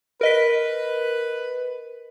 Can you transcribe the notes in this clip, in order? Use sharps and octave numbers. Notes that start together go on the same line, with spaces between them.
A#4 B4 D#5 B6